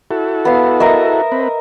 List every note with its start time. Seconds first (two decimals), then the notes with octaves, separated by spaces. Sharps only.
0.11 E4 F#4 A4
0.45 B3 F5
0.80 A#4 D#5 E5
1.32 C4 B4